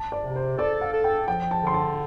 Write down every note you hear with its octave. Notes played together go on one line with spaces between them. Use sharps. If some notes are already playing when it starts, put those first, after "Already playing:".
Already playing: A5
D5
C3
C5
A4 D5
F5
A4
G5
F3 G5
A5
D3 C6
A5